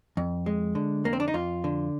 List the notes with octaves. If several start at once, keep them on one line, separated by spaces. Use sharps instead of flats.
F2
G#3
D3
F2 A#3
C4
D4
D#4
F2 F4
D3